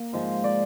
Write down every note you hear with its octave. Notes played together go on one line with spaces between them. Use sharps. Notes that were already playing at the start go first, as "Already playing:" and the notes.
Already playing: A#3
G#2 F3 G#3
D5